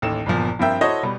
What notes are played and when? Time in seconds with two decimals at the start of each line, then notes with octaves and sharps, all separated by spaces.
0.02 A1 D#2 A3 E7
0.26 G1 E2 A#2 F3
0.59 G2 F3 C4 A#4 E5 G5
0.81 E4 F#4 A4 C5 C#5 D#5
1.03 B2 G3 B3